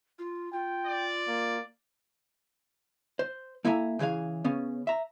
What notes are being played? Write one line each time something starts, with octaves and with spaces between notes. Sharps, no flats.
F4
F4 G5
D5
A#3
C5
A#3 E4 A4 E5 G#5 A#5
C#3 E3 G#4 A4 F5
C#3 B3 C#4
E5 A#5